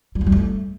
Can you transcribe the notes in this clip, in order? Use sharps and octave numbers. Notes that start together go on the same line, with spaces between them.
G3
B3
G3
A3